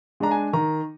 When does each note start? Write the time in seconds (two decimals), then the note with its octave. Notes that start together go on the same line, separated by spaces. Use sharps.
0.20 G#3 D4 A#5
0.31 G#5
0.53 D#3 A#5